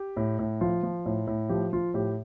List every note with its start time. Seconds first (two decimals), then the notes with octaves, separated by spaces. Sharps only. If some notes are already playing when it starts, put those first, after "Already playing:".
Already playing: G4
0.17 A2
0.39 A2
0.61 F3 F4
0.83 F3
1.06 A2
1.27 A2
1.49 F3 G4
1.73 F3 F4
1.94 A2 G4